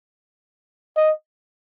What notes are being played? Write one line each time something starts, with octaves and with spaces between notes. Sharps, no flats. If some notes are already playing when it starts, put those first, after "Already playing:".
D#5